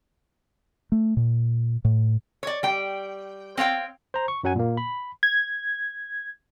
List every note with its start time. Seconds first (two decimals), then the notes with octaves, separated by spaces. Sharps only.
0.92 A3
1.17 A#2
1.85 A2
2.43 C#5 D5
2.63 G3 G5
3.57 C4 C#5 F5 G5
4.14 C5 A#5
4.28 C#6
4.44 F#2 F#3 F#5 G#5
4.56 A#2 A#3
4.77 B5
5.23 G#6